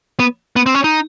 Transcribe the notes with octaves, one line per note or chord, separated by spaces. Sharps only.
B3
B3
C4
C#4
D#4